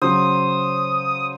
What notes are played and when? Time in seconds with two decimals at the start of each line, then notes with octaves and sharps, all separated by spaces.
0.02 C#3 F#3 C5 D#6